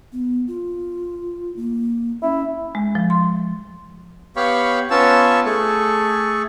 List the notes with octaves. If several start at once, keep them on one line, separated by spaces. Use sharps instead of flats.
B3
F4
A#3
C#4 E4
G#3
F3
C6
B3 G4 C#5 F5 B5 C#6
B3 C#4 F4 C#5 A5 E6
A3 G#4 A4 C#6